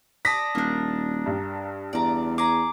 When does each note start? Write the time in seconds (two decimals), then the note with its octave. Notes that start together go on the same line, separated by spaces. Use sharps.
0.25 D5 A5 D#6 A#6 B6
0.55 D#1 A#3 D4
1.26 G2
1.93 E2 D5 A#5
2.38 G#4 A#5 D6